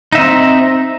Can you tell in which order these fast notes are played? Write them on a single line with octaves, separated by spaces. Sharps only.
D#4 E5 C4